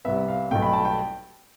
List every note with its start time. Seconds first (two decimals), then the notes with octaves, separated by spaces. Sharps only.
0.05 C2 C3 G3 B3 E5
0.28 F5
0.51 B1 B2 A3 G5
0.62 B5
0.73 A5
0.85 G5